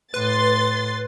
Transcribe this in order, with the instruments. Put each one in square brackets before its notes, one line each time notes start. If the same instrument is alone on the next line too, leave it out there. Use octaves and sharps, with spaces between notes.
[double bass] A2 [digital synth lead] B4 [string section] C6 A6